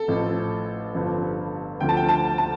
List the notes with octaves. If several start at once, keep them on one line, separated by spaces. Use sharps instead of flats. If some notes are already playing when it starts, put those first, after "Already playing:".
Already playing: A4
A1 A2 F3
G1 G2 F3
D2 D3 F3 G5
A5
G5
A5
A5